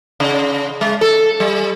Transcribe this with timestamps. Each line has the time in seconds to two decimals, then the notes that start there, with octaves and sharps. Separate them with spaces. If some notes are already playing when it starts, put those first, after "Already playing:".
0.20 C#3
0.81 G#3
1.01 A4
1.40 G3